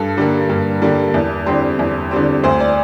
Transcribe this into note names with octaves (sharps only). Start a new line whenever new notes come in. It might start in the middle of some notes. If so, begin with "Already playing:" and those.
Already playing: G2 A4
D3 G3 A#3
G2
D3 G3 A#3
E2
D3 G3 C4
E2
D3 G3 C4
D2 C5
D5